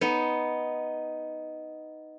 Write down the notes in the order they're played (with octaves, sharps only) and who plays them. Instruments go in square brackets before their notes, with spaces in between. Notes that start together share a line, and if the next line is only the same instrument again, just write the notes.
[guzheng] B3 D#4